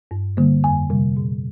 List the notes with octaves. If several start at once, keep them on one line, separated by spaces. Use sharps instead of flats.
G2
D3 G3 A#3
F2 G#5
C3 G3
A#2